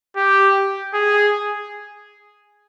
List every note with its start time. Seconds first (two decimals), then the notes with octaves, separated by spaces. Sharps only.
0.16 G4
0.94 G#4